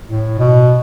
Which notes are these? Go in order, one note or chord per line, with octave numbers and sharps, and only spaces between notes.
A2
B2